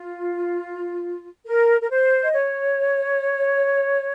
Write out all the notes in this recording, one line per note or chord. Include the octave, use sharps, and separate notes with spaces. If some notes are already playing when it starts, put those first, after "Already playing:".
Already playing: F4
A#4
A#4
C5
D#5
C#5